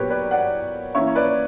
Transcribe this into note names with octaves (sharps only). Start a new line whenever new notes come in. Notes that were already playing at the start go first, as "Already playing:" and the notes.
Already playing: A#2 F#3 B3 G4 A#4 B4 C#5
B4 D5
D5 F#5
E3 A#3 C#4 C#5 E5
B4 D5